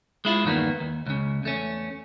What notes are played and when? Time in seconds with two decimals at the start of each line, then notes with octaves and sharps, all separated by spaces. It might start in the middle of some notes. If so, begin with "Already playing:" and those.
0.25 G#3 E4 F4
0.44 E2 G2 D#3 A#3 B3
0.80 D#2
1.06 C#2 C#3
1.43 E2 A3 C#4